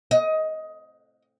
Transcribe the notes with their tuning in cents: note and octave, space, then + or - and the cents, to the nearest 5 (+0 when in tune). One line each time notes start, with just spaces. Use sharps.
D#5 +15